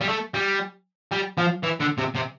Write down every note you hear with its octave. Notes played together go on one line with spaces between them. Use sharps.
G3
A3
G3
G3
F3
E3
D3
C3
C3